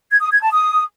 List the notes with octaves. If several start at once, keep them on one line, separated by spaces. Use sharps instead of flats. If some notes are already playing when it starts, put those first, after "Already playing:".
G#6
D#6
G#6
A5
D#6